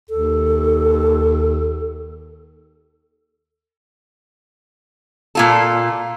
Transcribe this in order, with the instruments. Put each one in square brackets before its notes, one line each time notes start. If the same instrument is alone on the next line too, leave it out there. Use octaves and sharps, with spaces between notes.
[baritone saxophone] D#2 [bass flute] A4
[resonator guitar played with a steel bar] A#2 F4 A4